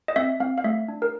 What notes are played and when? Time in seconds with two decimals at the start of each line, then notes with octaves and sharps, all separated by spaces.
0.08 D#5
0.16 C4 E5
0.40 C4 F5
0.58 F5
0.64 A3 E5
0.88 D4
1.02 A#4